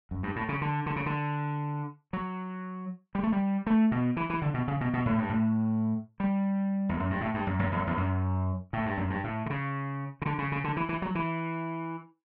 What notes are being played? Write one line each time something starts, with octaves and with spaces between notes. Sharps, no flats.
F#2
G2
A2
C#3
D3
D3
C#3
D3
F#3
G3
A3
G3
A3
B2
E3
E3
D3
B2
C#3
B2
B2
A2
G2
A2
G3
E2
F#2
G2
A2
G2
F#2
F#2
E2
F#2
E2
F#2
A2
G2
F#2
G2
A2
D3
C#3
C#3
D3
C#3
C#3
D3
E3
E3
F#3
E3